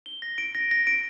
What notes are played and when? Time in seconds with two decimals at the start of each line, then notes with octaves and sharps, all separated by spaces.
0.06 G7
0.22 A#6
0.38 D7
0.55 A#6
0.71 A#6
0.87 D7